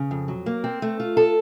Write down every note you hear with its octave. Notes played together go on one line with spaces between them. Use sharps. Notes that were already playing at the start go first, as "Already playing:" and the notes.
Already playing: C#3
F2
F#3
A#3
C4
A3
F4
A4